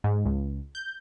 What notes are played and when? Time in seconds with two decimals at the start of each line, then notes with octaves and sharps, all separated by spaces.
0.04 G#2
0.25 C#2
0.75 G6